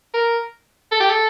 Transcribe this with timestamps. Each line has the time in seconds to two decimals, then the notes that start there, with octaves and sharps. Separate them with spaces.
0.14 A#4
0.92 A4
1.01 G4
1.10 A4